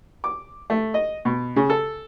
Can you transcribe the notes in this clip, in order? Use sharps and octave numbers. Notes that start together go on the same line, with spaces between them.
D6
A3
D#5
B2
C#3
A4